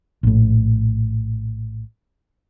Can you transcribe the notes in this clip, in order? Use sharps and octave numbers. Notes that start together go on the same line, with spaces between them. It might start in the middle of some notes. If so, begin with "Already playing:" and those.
A#1 A2